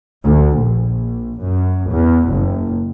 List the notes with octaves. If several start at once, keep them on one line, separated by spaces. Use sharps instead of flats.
D2
A#1
F#2
E2
F#1